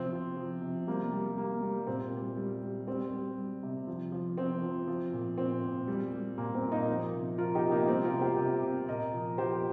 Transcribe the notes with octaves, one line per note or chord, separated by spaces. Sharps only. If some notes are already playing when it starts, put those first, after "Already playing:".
Already playing: C3 F3 C4
F3
F3
C3
G3 A#3
G3
G3 A#3
G3
A#2 C4
G3
G3
G3
G3 C4
G3
G3
C3
F3
F3
F3 C4
F3
F3
A#2
A#2 C4
A#2
G3
G3
A#2 A#3
C4
A#2
A#3 D#4
F3
C3
F3 F4 A#4
D#4 G4
C3
A#3 D#4
G3 C4
F4 A#4
C3
G4 C5
C3
C3
A#2 A#4 D#5
F3
F3 G4 C5